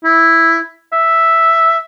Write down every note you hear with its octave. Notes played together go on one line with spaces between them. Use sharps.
E4
E5